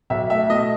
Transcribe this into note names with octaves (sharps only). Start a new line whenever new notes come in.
B1 E5
A3 E5
B2 D#5